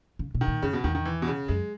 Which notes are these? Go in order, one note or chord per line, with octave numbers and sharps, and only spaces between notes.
C#3
B2
D#3
A#2
F#2 C#3
B2
E2 D#3
D#3
E3
B2
C#3
F#2 G#3